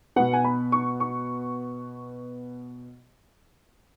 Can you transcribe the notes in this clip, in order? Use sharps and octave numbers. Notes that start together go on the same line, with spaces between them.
B2 B3 F#5
G#5
B5
C#6
C#6